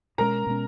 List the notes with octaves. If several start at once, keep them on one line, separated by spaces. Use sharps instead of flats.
B2 G#3 C#4 A#4 A#5
B2 G#3 C#4